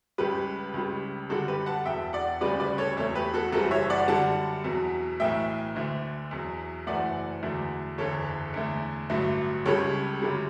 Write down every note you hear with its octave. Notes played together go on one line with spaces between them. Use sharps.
C#2 C#3 G3 G4 B4
C#2 C#3 G3
F#2 D3 G3 F#4 A4
G4 B4
F#5 A5
E1 E2 B2 E5 G5
D5 F#5
D2 C#3 G3 B4 D5
B4 D5
A4 C#5
E2 B2 A3 A4 C#5
G4 B4
F#4 A4
F#1 F#2 E3 G3 F#4 A4
C#5 E5
D5 F#5
F#2 D3 G3 F#5 A5
E2 B2 F#3
B1 A2 E3 A3 E5 G5
D2 D3 A3
E2 B2 F#3
F#1 F#2 E3 A3 D5 F#5
E2 D3 F#3 A3
F#1 E2 D3 A4 C#5
E2 D3 A3
A1 G2 D3 F#3 A3
C#2 C#3 G3 A4 C#5
F#2 D3 G3